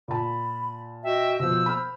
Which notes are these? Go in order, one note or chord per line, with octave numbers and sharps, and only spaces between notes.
A#2 A5 B5
F#4 D#5 E5 G5
B2 F3 C5 E6
B5 F6